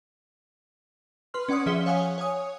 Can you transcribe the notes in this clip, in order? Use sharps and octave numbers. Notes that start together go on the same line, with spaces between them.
B4 C6 F6
C#4 D5 F#5 C6 D#6
F3 G#4 E5 B6 C#7 G7
C#5 F5 F#5 G#5 D#6
C#5 G#5 D#6